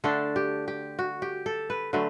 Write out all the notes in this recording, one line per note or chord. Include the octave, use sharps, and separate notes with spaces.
D3 A3 D4 A4
G4
G4
F#4
G4
A4
B4
D3 F#3 A3 B4